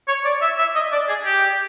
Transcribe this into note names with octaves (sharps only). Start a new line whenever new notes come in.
C#5
D5
E5
E5
D#5
D5
G#4
G4